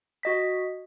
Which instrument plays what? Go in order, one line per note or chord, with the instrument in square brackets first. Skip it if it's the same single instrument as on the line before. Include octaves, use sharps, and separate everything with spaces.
[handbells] F#4 D#5 B6